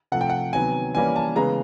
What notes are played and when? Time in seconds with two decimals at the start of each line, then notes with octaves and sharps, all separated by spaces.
0.12 C3 F3 A3 F#5
0.21 G5
0.30 F#5
0.53 C3 D#3 F#3 B3 G#5
0.95 E3 G3 A#3 C#4 G#5
1.16 A5
1.36 C#3 E3 G#3 B3 A#5